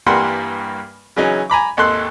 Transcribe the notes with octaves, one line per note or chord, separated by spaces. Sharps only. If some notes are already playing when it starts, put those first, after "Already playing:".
G2 E3 G3 A#3 F#5 C6
C#3 E3 F#3 C#4 D#4
G#5 A#5 B5 D6
G#1 D#2 A4 C6 F#6